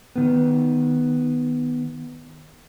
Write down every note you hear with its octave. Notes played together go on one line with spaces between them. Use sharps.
D#3 B3